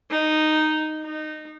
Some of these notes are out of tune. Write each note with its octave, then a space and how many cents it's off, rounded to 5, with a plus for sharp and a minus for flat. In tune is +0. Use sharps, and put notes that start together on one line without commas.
D#4 -5
D#4 -20